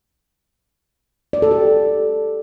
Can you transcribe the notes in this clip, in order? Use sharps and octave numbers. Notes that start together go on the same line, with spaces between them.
D5
A4
G4